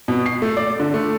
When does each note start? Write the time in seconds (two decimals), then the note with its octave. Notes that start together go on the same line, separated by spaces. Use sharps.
0.08 B2
0.26 C7
0.42 A3
0.57 D5
0.80 D3
0.94 A3